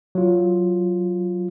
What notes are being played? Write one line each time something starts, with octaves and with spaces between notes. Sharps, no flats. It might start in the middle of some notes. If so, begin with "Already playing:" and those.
F#3 F4